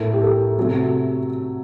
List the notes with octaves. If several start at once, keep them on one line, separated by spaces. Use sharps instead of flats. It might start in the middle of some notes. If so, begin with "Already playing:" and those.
Already playing: A2 A3 A#4
G4
A4
C3 F#3 A3